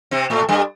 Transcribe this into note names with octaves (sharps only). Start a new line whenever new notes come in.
C3 C4
A2 A3
G2 G3